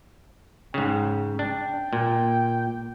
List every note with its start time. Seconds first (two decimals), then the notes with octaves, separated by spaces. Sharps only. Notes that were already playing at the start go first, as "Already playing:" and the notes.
0.74 G#2 C#3 G5
1.39 D4 G5
1.93 A#2